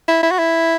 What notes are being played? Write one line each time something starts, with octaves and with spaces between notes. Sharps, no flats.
E4
E4
F#4
E4